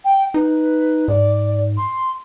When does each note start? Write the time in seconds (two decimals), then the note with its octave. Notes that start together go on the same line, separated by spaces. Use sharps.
0.04 G5
0.34 D#4 B4
1.08 G#2 D5
1.77 C6